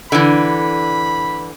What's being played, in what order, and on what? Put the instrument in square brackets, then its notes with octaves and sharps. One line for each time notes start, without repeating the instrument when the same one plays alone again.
[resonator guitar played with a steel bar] D3 E3 [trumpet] B5